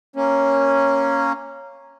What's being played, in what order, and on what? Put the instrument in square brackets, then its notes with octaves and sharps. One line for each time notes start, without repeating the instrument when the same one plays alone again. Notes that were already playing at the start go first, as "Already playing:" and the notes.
[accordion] A#3 C#4